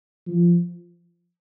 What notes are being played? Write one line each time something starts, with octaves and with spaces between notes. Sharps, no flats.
F3